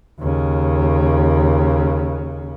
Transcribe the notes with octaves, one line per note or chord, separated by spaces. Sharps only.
D#2 C#3